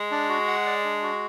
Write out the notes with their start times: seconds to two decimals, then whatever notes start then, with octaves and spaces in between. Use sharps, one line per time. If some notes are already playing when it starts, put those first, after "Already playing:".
Already playing: G#3
0.11 D4
0.29 F#4
0.47 F#5
0.66 D5
0.85 D4
1.03 F#4